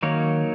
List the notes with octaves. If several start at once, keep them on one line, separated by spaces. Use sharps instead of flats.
D#3 F#3 A#3 D#4 A#4 C#5